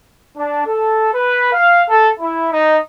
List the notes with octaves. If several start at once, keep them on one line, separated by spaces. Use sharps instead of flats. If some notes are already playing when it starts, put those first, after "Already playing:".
D4
A4
B4
F5
A4
E4
D#4